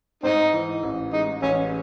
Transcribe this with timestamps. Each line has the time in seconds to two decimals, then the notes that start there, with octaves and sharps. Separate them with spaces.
0.23 G#2 C4 D#4
0.53 E3
0.83 A1
1.13 G#3 D#4
1.42 A1 C#4